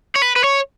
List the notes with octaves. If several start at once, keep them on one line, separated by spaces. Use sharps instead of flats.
C#5
B4
B4
C#5